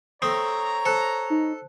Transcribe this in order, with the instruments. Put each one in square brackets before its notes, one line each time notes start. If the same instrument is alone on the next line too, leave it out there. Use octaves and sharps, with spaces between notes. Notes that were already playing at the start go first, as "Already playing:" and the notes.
[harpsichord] A3 C4 [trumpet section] C#5 A#5 [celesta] D#6
[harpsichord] A4 [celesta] C5 A5 F#6
[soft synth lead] D#4